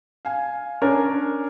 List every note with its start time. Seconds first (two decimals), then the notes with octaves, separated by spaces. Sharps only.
0.25 F5 G#5
0.82 C#4 D4 A#4 C#5